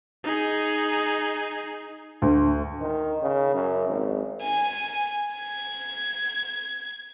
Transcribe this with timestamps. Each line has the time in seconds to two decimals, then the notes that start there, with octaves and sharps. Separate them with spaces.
0.24 D#4 G#4
2.22 D2
2.81 D#3
3.22 C#3
3.55 F#2
3.88 G#1
4.41 G#5
5.36 G#6